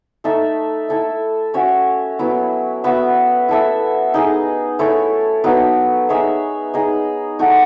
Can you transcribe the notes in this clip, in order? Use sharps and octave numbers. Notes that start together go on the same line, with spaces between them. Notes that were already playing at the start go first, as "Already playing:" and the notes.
A3 D#4 A4 E5
E4 A4 E5
C#4 F#4 C#5 E5
F#3 B3 E4
B3 F#4 B4 E5
E4 A4 E5
D#4 G#4 D#5
A3 E4 A4 C#5
F#3 B3 D#4
D#4 G#4 C#5 E5
D#4 G#4 D#5
F#3 A3 D#4 F#4